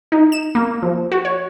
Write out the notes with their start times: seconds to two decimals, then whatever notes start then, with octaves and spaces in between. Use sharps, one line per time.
0.12 D#4
0.32 E7
0.55 A#3
0.82 F3
1.12 F#4
1.25 C#5